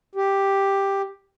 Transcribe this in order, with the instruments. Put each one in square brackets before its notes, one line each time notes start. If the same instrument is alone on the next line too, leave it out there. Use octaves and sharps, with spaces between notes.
[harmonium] G4